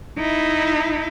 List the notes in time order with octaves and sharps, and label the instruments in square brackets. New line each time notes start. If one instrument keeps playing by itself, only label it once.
[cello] D#4 E4